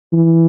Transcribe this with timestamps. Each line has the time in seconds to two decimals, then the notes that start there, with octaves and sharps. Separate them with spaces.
0.13 E3